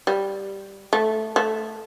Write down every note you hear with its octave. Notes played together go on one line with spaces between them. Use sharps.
G3
A3
A3